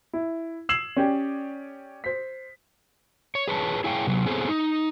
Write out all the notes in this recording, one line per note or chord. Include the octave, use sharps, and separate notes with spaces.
E4
E6 G#6 C7 E7 F#7
C#4 G4 D5
C5 B6
C#5
G#4 B4 C#5 A5
E4 G#4 C#5 F5 G5
C3 F#3
B3 C4 G#4 A4 C5 C#5
D#4